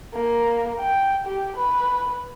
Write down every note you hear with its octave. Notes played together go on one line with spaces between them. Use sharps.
A#3
G5
G4
B4